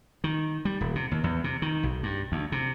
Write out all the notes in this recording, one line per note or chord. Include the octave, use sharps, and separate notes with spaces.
D#3
G3
D#1
C3
D#2
E2
C3
D#3
B1
G2
D2
C3